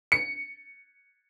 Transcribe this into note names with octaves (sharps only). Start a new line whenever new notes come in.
C#7